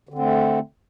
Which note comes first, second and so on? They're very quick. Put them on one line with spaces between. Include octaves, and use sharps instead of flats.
D3 C4 A3